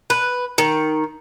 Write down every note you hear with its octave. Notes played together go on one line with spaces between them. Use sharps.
B4
D#3